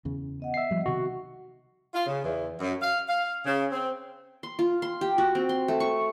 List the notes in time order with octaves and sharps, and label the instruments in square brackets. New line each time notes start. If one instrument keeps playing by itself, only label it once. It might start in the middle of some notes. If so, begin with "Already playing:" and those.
[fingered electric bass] E2 C#3
[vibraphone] B3 D#5 F#5
[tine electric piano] E5 C7
[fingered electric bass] F3 G3
[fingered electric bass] C3 D#3 [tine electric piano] F#4
[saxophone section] F4
C#3
E2
F#2
F5
F5
C#3
C4
[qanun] C6
F4
C6
G4
F#4
C4
C6
A3
C#6